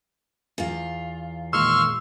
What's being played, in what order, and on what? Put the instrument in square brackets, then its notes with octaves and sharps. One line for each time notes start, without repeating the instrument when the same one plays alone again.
[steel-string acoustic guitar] E2 F4
[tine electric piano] A#2 D#3 G#3 [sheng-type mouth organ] C6 C#6 F6 [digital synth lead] E6